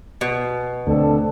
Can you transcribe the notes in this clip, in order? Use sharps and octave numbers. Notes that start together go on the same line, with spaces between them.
B2
D2 C4 D4 A4